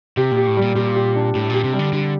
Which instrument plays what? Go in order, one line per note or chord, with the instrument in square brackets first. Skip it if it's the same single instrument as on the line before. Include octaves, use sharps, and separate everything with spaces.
[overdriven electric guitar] C3 [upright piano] G4
[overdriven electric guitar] A#2
[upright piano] G4
[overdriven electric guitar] A2
[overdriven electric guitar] A#2 [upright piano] G3
[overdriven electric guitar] A#2 [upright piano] G4
[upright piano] G4
D4
[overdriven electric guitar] A2 [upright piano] G4
[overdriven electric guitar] A#2 [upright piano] G4
[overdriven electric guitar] C3
[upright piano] G3
[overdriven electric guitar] D3
[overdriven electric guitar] D3 [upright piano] G3